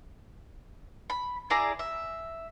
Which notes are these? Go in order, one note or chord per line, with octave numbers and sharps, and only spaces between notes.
B5
E4 G#4 D5 A#5
E5